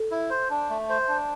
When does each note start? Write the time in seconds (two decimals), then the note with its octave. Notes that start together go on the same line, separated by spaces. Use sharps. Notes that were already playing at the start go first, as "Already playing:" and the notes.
Already playing: A4
0.11 E4
0.30 C5
0.50 D4
0.70 A3
0.89 C5
1.09 D4